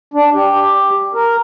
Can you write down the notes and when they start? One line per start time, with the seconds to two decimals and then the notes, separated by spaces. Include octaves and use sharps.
0.14 D4
0.35 G4
1.14 A#4